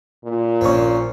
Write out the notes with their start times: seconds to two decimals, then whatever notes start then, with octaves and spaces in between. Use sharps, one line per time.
0.25 A#2
0.61 A#1 C4 C#4 C#6